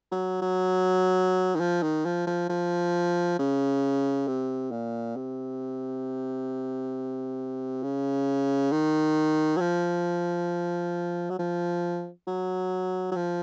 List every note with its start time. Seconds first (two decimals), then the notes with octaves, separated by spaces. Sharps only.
0.12 F#3
0.42 F#3
1.55 D#3
1.60 F3
1.83 D#3
2.05 F3
2.27 F3
2.49 F3
3.39 C#3
4.27 C3
4.72 A#2
5.16 C3
7.83 C#3
8.72 D#3
9.57 F#3
9.60 F3
11.30 F#3
11.39 F3
12.27 F#3
13.11 F#3
13.16 F3